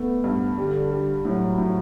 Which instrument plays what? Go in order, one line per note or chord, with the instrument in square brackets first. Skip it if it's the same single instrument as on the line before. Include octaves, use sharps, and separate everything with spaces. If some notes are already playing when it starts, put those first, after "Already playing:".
Already playing: [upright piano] A3 [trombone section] B3
[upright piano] G2
[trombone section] D3 [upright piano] G3
[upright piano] G3
[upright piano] A2 [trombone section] F#3
[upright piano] A2